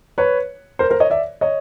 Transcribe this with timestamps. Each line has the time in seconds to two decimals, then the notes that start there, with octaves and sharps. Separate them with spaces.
0.18 B4 C#5
0.79 A#4 C5
0.90 A#4 C5
1.00 C#5 D#5
1.10 D5 E5
1.41 C#5 D#5